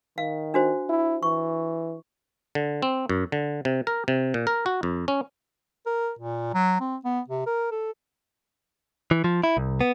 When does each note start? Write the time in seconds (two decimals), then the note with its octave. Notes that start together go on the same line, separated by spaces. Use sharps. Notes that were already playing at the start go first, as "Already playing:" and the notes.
0.18 D#3 F5
0.54 D4 F#4 C5
0.89 E4
1.23 E3 C#6
2.55 D3
2.82 C4
3.09 F#2
3.32 D3
3.65 C3
3.87 A#4
4.08 C3
4.34 A#2
4.47 A#4
4.66 F#4
4.83 F2
5.08 C#4
5.86 A#4
6.19 A#2
6.54 F#3
6.80 C4
7.05 B3
7.28 C3
7.46 A#4
7.71 A4
9.11 E3
9.24 F3
9.44 E4
9.57 C2
9.81 B3